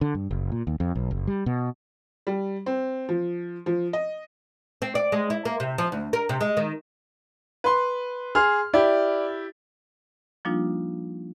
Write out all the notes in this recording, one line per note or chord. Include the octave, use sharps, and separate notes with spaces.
D3
G2
F#1
A#2
D#2
F2
B1
F#1
G3
B2
G3
C4
F3
F3
D#5
C4
D5
G#3
E4
A#3
C3
F3
D2
A#4
C3
G#3
D#3
B4 C6
G#4 C6 F6
E4 G4 D5
F3 G3 A#3 D4 D#4 F4